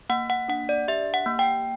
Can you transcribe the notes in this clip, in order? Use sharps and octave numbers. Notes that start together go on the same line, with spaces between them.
A#3 F#5
F#5
D4 F#5
D5
G4 E5
F#5
A#3
G5